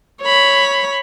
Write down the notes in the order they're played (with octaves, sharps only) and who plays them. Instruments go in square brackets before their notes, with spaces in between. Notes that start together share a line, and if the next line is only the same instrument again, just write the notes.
[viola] C#5 B5